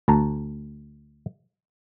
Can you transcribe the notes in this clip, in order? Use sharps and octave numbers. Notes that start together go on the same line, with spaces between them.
D2 A5 A#5